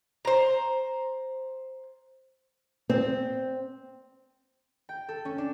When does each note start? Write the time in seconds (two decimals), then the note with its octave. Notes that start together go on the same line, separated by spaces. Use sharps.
0.25 C5 A#5
2.90 C4
4.89 G5
5.09 A4
5.25 C#4
5.38 D4